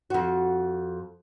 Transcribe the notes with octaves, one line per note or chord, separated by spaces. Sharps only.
F2 F#4